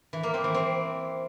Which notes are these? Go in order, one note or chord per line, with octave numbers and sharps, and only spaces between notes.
E3
A#3
C4
E3
C4